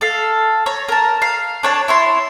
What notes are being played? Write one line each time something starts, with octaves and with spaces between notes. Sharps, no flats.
A4 F5
C#5 A#5
A#4 A5
F5
D4 C#5 A5
E4 C#5 C6